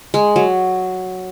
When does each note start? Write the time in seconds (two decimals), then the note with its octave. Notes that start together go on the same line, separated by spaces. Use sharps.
0.14 G#3
0.36 F#3